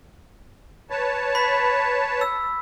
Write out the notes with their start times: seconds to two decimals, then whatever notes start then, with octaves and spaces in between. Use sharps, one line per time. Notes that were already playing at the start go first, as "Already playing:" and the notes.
0.90 B4 C#5 A5
1.35 B5 B6
2.21 E6